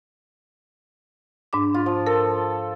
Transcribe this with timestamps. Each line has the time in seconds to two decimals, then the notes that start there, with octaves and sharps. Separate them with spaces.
1.53 G#2 D4 D6
1.74 F4
1.86 F3
2.07 A4 A#4